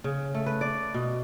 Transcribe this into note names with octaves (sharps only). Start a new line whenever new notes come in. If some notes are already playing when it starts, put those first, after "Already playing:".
C#3
A3
B4
D5
B2